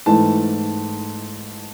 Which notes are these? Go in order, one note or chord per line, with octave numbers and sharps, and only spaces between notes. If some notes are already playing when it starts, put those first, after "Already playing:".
G#2 E3 A3 A5